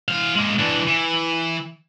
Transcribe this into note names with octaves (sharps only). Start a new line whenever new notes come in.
E3 F5
G#3 A#3
E3 D4
E3